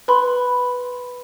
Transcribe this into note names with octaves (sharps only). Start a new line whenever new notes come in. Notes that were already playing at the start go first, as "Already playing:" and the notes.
B4 B5 C6